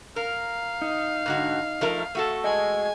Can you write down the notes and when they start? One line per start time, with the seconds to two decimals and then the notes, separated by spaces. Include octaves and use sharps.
0.16 A#4 F5
0.82 D#4
1.26 G#2 D3 F#4
1.81 F3 A3 A#4
2.15 A3 F#4 A4
2.44 G#4 D#5 G#5